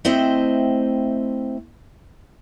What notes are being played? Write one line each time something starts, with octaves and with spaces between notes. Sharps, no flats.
A3 C4 E4 C5 D#5 G5